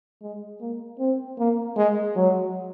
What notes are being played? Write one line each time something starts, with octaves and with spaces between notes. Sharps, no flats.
G#3
A#3
C4
A#3
G#3
F#3